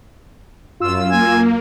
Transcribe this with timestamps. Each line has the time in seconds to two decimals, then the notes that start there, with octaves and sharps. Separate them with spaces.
0.80 F#2 F4 E6
1.11 A#3 G#5